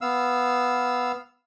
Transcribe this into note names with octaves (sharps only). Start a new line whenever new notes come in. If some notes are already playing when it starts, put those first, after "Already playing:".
B3 F5 E6